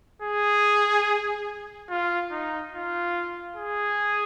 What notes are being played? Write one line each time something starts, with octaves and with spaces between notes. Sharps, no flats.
G#4
F4
D#4
F4
G#4